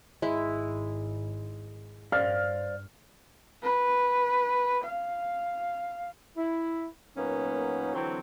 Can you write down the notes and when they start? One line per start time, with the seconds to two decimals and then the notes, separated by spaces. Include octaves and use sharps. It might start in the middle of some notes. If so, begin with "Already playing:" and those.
0.22 G#1 G#3 E4
2.12 G2 C5 D5 F5 F6
3.63 B4
4.84 F5
6.37 E4
7.16 A#2 F#3 A#3 B3 C#4 D#4
7.94 D3 E3 F#3 C4